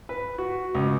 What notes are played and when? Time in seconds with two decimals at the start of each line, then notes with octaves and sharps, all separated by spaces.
0.09 B4
0.38 F#4
0.75 C#2